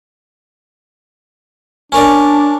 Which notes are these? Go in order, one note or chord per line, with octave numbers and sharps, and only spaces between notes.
C#4 D4 A#4 D5